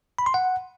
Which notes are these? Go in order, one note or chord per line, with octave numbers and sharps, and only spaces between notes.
B5
C6
F#5